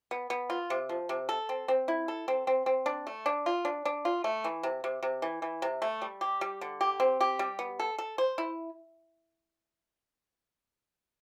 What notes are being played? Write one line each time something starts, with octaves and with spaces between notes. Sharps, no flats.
B3
B3
F4
C3
F3
C3
A4
C4
C4
E4
A4
C4
C4
C4
D4
A3
D4
F4
D4
D4
F4
A3
E3
C3
C3
C3
E3
E3
C3
A3
G3
G4
G3
D3
G4
C4
G4
G3
B3
A4
A4
C5
E4